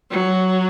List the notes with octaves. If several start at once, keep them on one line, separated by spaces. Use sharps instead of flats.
F#3